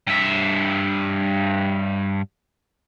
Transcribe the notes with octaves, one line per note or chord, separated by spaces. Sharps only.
G2 E5